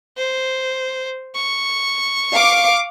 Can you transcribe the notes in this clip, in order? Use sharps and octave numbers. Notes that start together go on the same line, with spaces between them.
C5
C#6
F5 D6